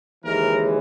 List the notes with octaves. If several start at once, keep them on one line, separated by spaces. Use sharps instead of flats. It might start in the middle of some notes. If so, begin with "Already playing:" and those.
D#2 C#3 E3 G#3 A#4